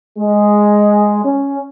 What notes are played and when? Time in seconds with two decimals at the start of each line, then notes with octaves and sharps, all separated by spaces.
0.18 G#3
1.24 C#4